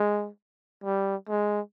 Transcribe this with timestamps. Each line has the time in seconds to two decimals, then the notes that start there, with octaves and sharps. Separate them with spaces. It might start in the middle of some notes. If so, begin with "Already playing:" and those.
Already playing: G#3
0.84 G3
1.29 G#3